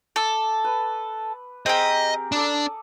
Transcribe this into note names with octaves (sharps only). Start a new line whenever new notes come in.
A4 D6
B4
C4 G4 G#4 A#4 D#5 A#5
D4 A4 D5 D#6